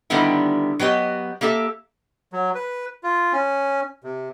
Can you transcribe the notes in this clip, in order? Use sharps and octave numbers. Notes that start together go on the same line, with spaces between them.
D3 D#3 G3 B3 E4
F#3 B3 G4 D#5
A#3 G4 A4 E5
F#3
B4
F4
C#4
C3